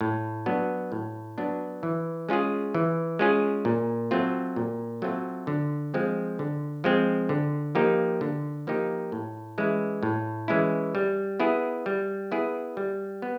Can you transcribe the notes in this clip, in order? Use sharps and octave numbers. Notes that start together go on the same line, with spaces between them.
A2
F#3 B3 D4
A2
F#3 B3 D4
E3
G#3 C#4 F4 G#4
E3
G#3 C#4 F4 G#4
A#2
F#3 A3 C4 F4
A#2
F#3 A3 C4 F4
D3
F3 G#3 C4
D3
F3 G#3 C4
D3
F3 A#3 D#4 G4
D3
F3 A#3 D#4 G4
A2
E3 G#3 C#4 E4
A2
E3 G#3 C#4 E4
G3
B3 E4 G#4
G3
B3 E4 G#4
G3
B3